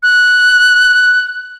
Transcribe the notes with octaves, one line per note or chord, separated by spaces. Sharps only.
F#6